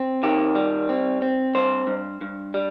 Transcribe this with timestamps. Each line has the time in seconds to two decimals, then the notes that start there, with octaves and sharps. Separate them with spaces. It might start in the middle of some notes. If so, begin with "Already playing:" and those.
Already playing: C4
0.23 D#3 G4
0.55 G3
0.89 C4
1.22 C4
1.55 G2 C5
1.87 G2
2.21 G2
2.54 G3